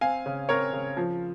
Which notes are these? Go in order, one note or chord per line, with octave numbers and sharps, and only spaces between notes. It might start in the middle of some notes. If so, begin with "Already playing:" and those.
C4 F5 G#5
C#3
C4 A#4 C#5
C#3
F3